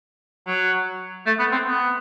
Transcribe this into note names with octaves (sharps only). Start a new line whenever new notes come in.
F#3
A3
B3
C4
B3